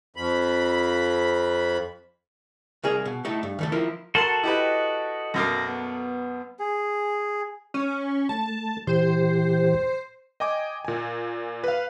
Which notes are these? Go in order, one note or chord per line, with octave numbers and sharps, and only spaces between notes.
F2 B5
C2 A#3 G#4
B2
A3 D#4 E4 A4
G2
D#2 A3 A4
F3 E4 A#4
F#4 A4 A#4 A5 C6
E4 G4 B4 D#5
F#2 B2 A#3 A#6
B3
G#4
C#4
A3 A5
A#2 E3 G4 C5
D#5 G5 G#5 D6
A#2 G#5
B4 F5